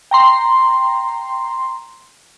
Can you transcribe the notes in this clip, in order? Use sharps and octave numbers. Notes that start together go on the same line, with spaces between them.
G5 A#5 C6